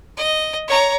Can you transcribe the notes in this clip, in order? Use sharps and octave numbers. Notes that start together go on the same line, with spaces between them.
D#5
C#5 A#5